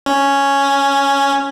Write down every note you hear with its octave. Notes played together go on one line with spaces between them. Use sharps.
C#4